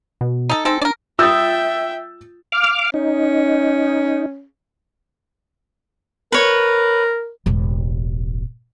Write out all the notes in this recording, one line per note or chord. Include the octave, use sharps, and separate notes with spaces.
B2
D#4 A4
G#3 C4 D#4 A4
D4 A#4 D5
F4 E5 G5 D#6 E6 G6 A6
F5 D6 F6
C#4 D#4
A#4 B4 C#5
E1 A1